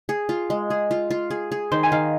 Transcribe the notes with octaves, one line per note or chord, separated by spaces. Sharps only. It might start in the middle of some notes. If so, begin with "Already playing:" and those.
G#4
F4
G#3
G#4
F4
F4
G#4
G#4
D#3 C5
G#5
D#3 F5